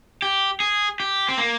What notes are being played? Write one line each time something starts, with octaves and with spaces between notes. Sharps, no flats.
G4
G#4
G4
C4
A#3